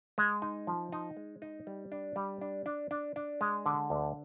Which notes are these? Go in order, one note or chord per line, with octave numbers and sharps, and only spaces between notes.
G#3
D#4
F3
D#4
G#3
D#4
G3
D4
G3
D4
D4
D4
D4
G#3
D3
D2